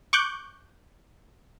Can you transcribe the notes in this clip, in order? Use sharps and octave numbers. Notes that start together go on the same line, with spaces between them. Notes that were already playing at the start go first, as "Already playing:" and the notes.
C#6 D6 F#6 G6